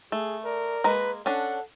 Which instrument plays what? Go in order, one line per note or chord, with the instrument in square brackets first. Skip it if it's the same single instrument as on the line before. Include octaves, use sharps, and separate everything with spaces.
[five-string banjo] A3 [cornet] G#4
[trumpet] A#4 [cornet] D5
[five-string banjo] G#3 A#3 A#5 [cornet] B4
[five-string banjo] C#4 D4 [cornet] A4 [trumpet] F#5